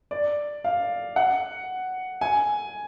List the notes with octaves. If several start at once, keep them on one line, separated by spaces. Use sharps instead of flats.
D5
F5
F#5
G#5